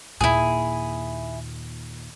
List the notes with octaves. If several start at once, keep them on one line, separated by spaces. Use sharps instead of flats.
D#2 A#2 E4 G#4